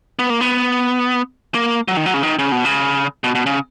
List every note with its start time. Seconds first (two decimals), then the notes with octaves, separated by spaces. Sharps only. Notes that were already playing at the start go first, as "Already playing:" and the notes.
0.19 B3
0.30 A#3
0.41 B3
1.55 A#3
1.88 F#3
1.97 D#3
2.06 F#3
2.14 C#3
2.23 D#3
2.39 C#3
2.52 B2
2.65 C#3
3.24 B2
3.35 B2
3.46 C#3